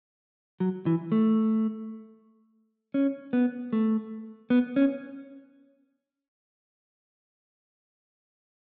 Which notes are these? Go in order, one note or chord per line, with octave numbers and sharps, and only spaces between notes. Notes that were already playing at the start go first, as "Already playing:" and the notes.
F#3
E3
A3
C#4
B3
A3
B3
C#4